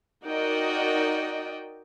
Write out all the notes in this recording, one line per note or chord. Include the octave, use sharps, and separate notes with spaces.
D#4 F#4 A#4 D5 D#5 G5